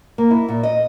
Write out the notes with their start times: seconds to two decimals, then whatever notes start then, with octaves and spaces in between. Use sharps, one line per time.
0.18 A#3
0.31 E4
0.49 A#2
0.63 D#5